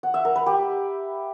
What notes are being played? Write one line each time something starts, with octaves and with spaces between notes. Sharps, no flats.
F#5
E5
A#4
B4
G4